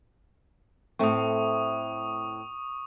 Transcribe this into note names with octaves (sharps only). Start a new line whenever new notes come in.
A2 A3 C4 C#6 D#6